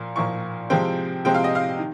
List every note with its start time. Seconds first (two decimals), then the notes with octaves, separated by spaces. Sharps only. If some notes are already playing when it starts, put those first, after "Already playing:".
Already playing: A#2 F3 A#3
0.16 A#2 F3 A#3 C#6
0.70 C3 F3 G#3 C4 G5
1.25 C3 F3 G#3 C4 G5
1.34 F5
1.44 D#5
1.55 F5
1.79 D#3